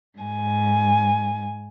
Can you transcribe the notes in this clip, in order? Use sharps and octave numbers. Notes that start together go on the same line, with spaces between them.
G#2 G#5